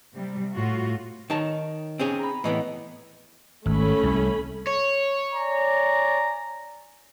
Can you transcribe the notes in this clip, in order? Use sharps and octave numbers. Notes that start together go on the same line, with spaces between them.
C3 G3
A2 F4 F#4
D#3 D#4 C#5 A5
C4 C#4 G#4
A#5 B5
A2 E3 B3 D#5
G#1 A3 C#4 B5
C2
C#5
D5 G#5 A#5